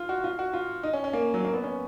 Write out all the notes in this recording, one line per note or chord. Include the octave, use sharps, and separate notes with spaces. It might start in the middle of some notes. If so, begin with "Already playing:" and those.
Already playing: F4
F#4
F4
F#4
F4
D#4
C#4
C#4
A#3
F#3
A#3
B3
C#4